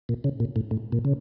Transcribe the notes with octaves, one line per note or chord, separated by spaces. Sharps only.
A#2
C#3
A#2
A2
A2
A#2
C#3